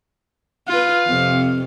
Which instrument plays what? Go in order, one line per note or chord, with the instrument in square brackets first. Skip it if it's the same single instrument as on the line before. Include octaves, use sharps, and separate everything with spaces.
[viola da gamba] F4 B4 [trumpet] F5
[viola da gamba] F2 C3